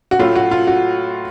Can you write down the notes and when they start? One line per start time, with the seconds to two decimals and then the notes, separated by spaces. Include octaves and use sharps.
0.11 F#4
0.19 A2 F#3 A3 F4
0.36 F#4
0.51 F4
0.67 F#4